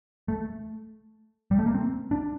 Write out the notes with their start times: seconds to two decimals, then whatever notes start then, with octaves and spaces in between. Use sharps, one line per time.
0.28 A3
1.51 G3
1.59 A3
1.66 A#3
1.74 C4
2.11 D4